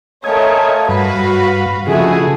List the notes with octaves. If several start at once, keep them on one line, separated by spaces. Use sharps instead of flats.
A3 A#4 C5 C#5 D#5 F5 G#5
G2 F#4 B4 F5 B5
C#3 F3 G#3 A3 E4 F#4 G#4 G#5